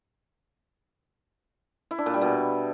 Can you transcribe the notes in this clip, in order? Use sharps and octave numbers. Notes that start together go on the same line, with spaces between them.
E4
D4
A#2
G3
B2